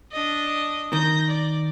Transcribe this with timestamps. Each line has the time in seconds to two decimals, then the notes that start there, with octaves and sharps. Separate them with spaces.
0.12 D4 D#5
0.93 D#3 G6 A#6
1.29 D5